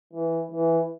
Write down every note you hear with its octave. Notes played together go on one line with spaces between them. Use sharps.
E3
E3